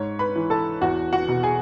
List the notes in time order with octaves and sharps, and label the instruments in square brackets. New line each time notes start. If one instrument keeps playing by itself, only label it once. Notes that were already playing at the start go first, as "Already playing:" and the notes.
Already playing: [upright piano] G#2 C#5
B4 B5
E3
A4 A5
E2 F#4 F#5
F#4 F#5
B2
G#4 G#5